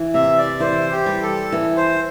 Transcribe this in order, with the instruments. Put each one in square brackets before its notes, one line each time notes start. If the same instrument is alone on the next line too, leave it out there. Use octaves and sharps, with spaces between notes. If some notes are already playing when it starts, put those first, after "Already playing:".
Already playing: [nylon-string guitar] E3
[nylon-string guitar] C3 [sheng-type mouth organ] E5
[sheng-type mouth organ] D5
[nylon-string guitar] E3 [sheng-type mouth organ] C5
[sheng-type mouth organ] G4
[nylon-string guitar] G3
[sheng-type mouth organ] A4
[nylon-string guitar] E3
[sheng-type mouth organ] C5